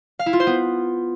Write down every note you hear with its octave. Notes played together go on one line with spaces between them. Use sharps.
F5
E4
F4
C5
B3